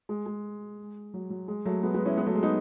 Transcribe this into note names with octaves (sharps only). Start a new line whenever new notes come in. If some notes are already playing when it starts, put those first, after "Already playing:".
G#3
G#3
F#3
F#3
G#3
F#3 A3
G#3 B3
G#3 B3
C#4 E4
G#3 B3
F#3 A3
G#3
B3 D#4